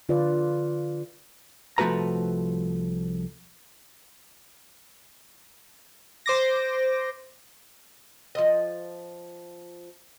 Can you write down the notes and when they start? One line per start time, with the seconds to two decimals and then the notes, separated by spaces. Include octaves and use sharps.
0.09 D3 F4 B4 D5
1.78 C2 F3 A3 F#4 B4 A#5
6.26 C5 D6 A#6
8.35 F3 D#5